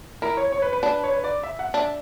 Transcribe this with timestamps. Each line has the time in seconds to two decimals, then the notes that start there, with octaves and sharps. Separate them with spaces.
0.22 E4 A#4
0.37 C#5
0.52 C#5
0.62 B4
0.73 B4
0.83 D4
1.04 C#5
1.13 B4
1.24 D5
1.43 E5
1.59 F#5
1.74 D4 E5